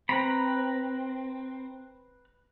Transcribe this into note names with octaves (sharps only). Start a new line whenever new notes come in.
C4 B4 A#5 B5